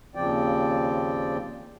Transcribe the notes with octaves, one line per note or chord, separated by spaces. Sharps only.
D#2 C#3 F3 C4 D5 G5